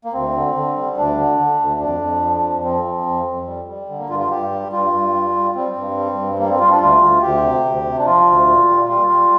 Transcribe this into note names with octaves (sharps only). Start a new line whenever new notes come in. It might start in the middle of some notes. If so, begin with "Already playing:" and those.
A#3
D2 C4
D3
D3
G3
D2 D4
D3
D3
D2
F2 D4
F2
F3
F2
F3 C4
F3
F2
F2
G3
G3
D3
A#3
G2 F4
F4
G2 G4
G3
G2 F4
G2
G3
G3
G3 C4
G2
G3
G2
G3 A#3
C4
G3 F4
D4
D2 F4
D2
D2 G4
C3
D2
C3
D4
F3 F4
D2
A#2
G3
G3 F4
G3